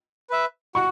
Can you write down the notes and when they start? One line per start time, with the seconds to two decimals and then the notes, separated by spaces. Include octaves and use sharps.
0.30 B4 E5
0.75 F#4 C#6